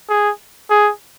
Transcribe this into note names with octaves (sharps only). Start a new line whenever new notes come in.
G#4
G#4